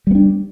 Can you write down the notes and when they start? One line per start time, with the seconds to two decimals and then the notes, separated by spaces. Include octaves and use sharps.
0.07 G3
0.11 B3
0.15 D4